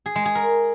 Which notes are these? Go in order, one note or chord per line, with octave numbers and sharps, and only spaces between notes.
G#4
G#3
G#4
A#4